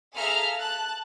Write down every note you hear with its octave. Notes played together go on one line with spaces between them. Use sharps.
G#4 A4 E5 F5 A#5 F6
A5 F#6